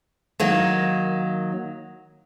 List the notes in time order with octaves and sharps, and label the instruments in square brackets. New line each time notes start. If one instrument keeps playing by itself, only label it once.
[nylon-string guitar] D#3 F#3 A#3